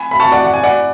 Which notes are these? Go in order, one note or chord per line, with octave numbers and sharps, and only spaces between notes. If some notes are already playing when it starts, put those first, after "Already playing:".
Already playing: G#5 B5
B5
A5 C#6
D5 F#5
F#5
G#5
D5 F#5